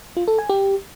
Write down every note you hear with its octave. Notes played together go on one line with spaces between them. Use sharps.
F4
A4
G#5
G4